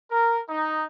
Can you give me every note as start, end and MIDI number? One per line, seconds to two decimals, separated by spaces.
0.11 0.40 70
0.50 0.85 63